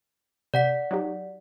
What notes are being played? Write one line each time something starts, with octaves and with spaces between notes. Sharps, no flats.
C3 D5 F#5 B6
F#3 D#4 G4